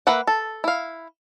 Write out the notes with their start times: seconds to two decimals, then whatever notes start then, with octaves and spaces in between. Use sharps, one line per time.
0.07 A#3 B4 E5 F#5
0.27 A4
0.64 E4 F5